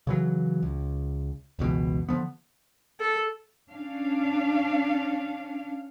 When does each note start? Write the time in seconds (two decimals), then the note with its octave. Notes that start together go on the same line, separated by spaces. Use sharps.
0.07 C#3 E3 F#3
0.62 C#2
1.59 F#1 C#2 B2 E3
2.09 D3 F3 B3
3.00 A4
3.70 C#4 D4 F5